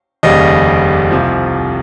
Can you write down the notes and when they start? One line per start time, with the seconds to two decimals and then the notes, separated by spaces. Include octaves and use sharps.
0.23 F1 D#2 C#3 G3 D#5
1.11 C2 C3 F3